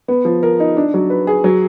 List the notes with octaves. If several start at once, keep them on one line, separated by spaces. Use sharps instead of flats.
B3
F3
A#4
D#4
D4
F#3
B4
G#4
F#3